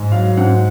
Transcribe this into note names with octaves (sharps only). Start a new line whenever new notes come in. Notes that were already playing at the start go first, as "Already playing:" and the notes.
Already playing: G#2
F#3 F5
G#2 F#5